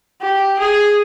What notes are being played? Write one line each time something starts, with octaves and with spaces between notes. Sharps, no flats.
G4
G#4